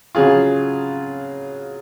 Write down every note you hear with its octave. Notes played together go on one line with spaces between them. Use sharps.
C#3 F#3 F4 G#4